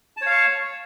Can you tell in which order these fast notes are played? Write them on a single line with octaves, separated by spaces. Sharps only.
A5 C#5 F5 C#6